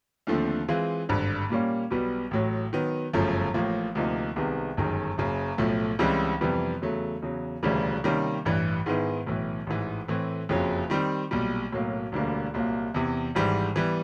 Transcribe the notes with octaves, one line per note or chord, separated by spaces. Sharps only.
D#2 D3 F3 A3 C4
E3 G#3 C4 F4
G#1 G2 D3
A#2 G3 A#3 C#4
B1 B2 G3 B3
A1 A2 F#3
D#3 F#3 B3
G1 F#2 C#3 F3 A3
A1 A2 F3 A#3
D2 C3 F3 A#3 D#4
C2 C3 D#3 G#3 B3
G1 F#2 D#3 G#3
F#1 F#2 C#3
B1 A2 F3 A3
C#2 C#3 E3 G3 C4
F2 C3 E3 G3 B3
E2 C#3 F#3 A3
E2 C#3 F#3
E1 D2 C#3 E3 G3
C3 D#3 G3 A#3 C#4
A1 G2 E3
G#2 D#3 G#3 B3 E4
B1 A2 E3
A1 G#2 E3
A2 E3 A3 C4
F#1 F2 C#3 F#3
D#3 G3 C4
B1 A#2 G3
B1 A2 F#3 A#3
E1 D2 D3 G3 A#3
C2 A#2 F#3 A#3
E2 C3 E3
G#1 G#2 E3 G3
E3 G3 B3